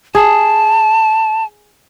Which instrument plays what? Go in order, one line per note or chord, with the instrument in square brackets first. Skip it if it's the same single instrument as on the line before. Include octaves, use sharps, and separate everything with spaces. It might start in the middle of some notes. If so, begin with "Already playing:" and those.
[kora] G#4 [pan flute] A5